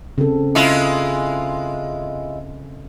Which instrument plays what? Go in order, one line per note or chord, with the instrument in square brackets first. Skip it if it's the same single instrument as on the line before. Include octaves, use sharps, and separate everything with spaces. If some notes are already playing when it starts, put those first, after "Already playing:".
[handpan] C#3 C4 A4
[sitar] G#3 E4 F4